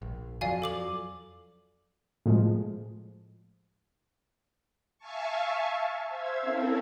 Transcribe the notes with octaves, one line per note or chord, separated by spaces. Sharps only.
A#1
F2 F3 F#3 D5 F5 G#5
A4 D6 F#7
A2 F3 G#3
E5 F5 G#5 A5 C#6
C5 E5 F5 E6 G#6
C4 C#4 E4 A4 A#4